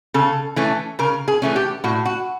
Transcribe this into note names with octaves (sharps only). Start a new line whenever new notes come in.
C#3 A4
E3 A3 C#4
C#3 A#4
G#4
E3 A3 C#4
G4
A2 F#4
F#4